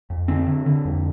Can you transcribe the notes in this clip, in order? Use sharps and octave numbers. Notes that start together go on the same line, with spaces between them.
F2
D3 C4
D3
D3
F2